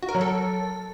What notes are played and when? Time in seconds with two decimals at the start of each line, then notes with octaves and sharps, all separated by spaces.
0.03 F#4
0.09 A#4
0.15 F#3
0.21 A4